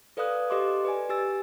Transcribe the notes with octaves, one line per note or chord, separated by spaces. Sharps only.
A4 B4 D5 F5 D#6 F#6
G4 A4 D#5 C6 D6
B4 D5 G#5
G4 G#5 E6 A6